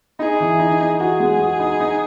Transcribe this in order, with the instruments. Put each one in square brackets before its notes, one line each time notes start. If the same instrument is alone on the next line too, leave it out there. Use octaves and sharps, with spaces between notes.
[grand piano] D#4 [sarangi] G#4
[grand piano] E3
D#4
D#4
[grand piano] F#4 [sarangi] G#4
[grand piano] G#3
F#4
D#4
D#4